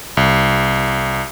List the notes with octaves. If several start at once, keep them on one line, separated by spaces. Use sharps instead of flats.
C2